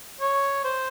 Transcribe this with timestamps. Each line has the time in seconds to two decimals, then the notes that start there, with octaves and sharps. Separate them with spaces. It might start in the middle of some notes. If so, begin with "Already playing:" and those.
0.21 C#5
0.65 C5